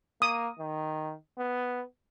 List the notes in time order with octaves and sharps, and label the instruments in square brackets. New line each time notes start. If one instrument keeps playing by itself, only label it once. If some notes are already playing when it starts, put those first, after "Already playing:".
[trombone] A#3 [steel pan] D#6
[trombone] D#3
B3